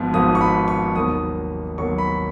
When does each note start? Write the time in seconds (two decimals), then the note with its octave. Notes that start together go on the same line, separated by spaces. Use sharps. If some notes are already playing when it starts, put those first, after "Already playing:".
Already playing: G#1 G#2 F3 B3
0.13 G#1 G#2 F3 B3 D#6
0.35 C#6
0.41 B5
0.68 C#6
0.96 D#2 D#3 F#3 B3 D#6
1.78 D#2 D#3 F#3 B3 C#6
1.98 B5